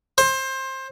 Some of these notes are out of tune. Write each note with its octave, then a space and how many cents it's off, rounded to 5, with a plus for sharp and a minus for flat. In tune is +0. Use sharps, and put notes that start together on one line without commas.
C5 +20